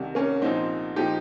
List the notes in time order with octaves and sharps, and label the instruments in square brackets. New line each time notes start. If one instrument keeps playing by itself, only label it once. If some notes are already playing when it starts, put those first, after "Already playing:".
Already playing: [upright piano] C2 C3 D#3
A#3 C#4
C2 A#2 F3 C4 D#4
A#2 F3 D#4 G4